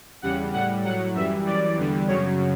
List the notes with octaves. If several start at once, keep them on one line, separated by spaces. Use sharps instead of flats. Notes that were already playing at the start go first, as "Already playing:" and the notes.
E2 C#3 G3 F#5
A2 G3 F#5
A2 F#3 F#5
F#2 E3 G3 E5
F#2 E3 G3 D5
E2 D3 G3
F#2 C#3 F#3 C#5